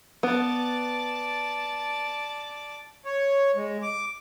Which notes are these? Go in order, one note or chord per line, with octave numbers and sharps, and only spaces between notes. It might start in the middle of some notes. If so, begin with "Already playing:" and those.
B3 D5 A5
C#5
G#3
D6